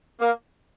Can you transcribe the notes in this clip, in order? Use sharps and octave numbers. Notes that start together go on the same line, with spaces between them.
A#3